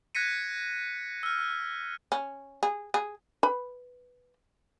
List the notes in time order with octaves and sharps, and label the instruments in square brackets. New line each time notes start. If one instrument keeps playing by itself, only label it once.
[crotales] F#6 G#6 A#6 B6 C#7 D#7
E6 F6
[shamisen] C#4
G#4
G#4
B4 B5